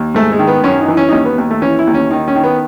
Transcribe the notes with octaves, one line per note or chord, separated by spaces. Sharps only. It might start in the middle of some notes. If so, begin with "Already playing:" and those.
Already playing: D#2
G#2 A3
G#3
D#3
B3
F#2 C#4
D#4
E3
C#4
D#4
D#2 C#4
B3
D#2
A3
E3 C#4
E4
D#2
C#4
D#3 D#4
C#4
D#3
B3